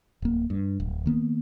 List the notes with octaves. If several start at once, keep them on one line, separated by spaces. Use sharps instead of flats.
D1 A#3
G2
D1
D#3 A#3 B3